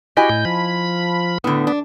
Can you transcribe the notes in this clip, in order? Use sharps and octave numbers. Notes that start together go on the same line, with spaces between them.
E4 F#4 G4 D#5 G5 G#5
A2 G6
F3 B5
A2 D3 B3
D4